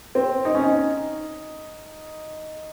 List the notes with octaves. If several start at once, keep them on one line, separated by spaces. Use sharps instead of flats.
C4
D#4
C#4
D#4